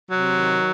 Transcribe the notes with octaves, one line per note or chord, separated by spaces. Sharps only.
C3 F#3
D#3